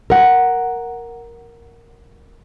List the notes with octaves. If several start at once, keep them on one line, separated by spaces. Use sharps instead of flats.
A#4 F#5